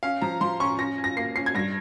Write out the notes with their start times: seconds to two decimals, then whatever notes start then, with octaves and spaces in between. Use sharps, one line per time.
0.03 C#4 F5
0.22 F3 A#5
0.41 F3 C6
0.60 C#4 C#6
0.79 C#4 A#6
0.98 C#4
1.04 A#6
1.17 A#3 C7
1.36 C#4 C7
1.46 G#6
1.55 G2 A#6